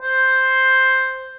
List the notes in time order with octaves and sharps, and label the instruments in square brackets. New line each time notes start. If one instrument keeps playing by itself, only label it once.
[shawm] C5